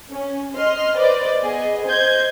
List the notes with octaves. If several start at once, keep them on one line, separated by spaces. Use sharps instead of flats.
C#4
D#5 C6 F6
B4 C5 D5 D#5
B3 G#4 D#5
C5 D#5 G6 G#6